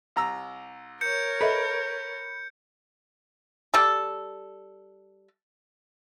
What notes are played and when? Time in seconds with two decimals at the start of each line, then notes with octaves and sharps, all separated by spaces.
0.16 C2 A#5 E6
1.01 A#4 C#5 G6 C#7
1.41 A4 B4 D#5 E5
3.74 G3 A4